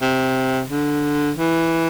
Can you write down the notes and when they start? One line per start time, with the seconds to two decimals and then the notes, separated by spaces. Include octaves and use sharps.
0.02 C3
0.70 D3
1.38 E3